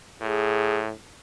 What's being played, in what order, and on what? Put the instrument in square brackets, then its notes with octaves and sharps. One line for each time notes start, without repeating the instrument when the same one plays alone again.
[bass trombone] A2 [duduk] G#4